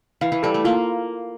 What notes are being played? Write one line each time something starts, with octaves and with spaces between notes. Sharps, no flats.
E3 F5
E3
G3 A4
A3
A#3 F4